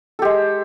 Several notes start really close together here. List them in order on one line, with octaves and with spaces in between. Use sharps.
A4 G4 G#3